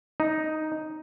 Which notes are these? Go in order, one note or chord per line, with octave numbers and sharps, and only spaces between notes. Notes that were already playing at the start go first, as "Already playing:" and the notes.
D#4